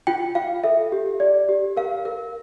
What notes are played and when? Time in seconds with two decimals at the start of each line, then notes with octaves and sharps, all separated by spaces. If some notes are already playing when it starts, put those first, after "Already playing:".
0.07 F4 G5
0.35 F4 F5
0.64 A4 E5
0.92 G4
1.20 D5
1.49 G4
1.77 A#4 F5
2.05 A#4